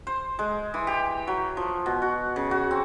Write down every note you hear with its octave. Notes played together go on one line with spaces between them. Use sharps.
C5
G#3
E3
G4
F#3
F3
B2
F#4
C#3
F#4
C4